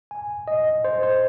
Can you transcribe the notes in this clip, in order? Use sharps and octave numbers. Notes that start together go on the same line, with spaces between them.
G#5
D#5
C5
C5